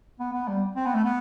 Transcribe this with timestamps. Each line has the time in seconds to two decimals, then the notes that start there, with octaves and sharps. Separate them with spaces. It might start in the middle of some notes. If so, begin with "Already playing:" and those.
0.20 B3
0.33 B3
0.48 G3
0.76 C4
0.86 B3
0.95 A3
1.04 B3